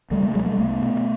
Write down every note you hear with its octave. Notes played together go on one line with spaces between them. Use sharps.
C#2 G3 A3
G#3 A#3
B2 F#3 G#3
G3 A3
C2 A3 B3
B2